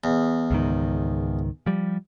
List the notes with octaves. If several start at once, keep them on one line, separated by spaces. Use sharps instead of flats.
E2
C#2 G#2 D#3
F3 G3